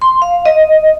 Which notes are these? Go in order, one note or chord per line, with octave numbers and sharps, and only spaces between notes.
C6
F5
D#5